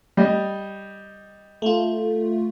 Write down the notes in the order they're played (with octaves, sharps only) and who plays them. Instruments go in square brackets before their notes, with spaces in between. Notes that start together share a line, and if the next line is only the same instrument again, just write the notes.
[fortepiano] G3 D#5
[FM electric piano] A3 F4